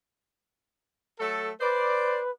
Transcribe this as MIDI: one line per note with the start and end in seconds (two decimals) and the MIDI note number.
1.19 1.51 54
1.19 1.51 57
1.19 1.51 69
1.60 2.31 71
1.60 2.20 72
1.60 2.20 74